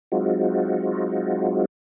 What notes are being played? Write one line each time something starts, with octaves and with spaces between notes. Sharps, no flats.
F#3 G#3 C4 D#4 F4 F#4